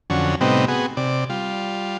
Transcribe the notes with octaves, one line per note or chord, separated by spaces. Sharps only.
F2 D3 F#3 C#4
A2 C3 G3 B3 C4 D#4
B3 F#4 G#4
C3 D5
G3 F4